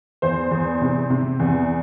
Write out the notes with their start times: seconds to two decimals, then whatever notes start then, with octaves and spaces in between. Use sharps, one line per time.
0.22 E2 C5
0.51 E2
0.81 C3
1.10 C3
1.39 E2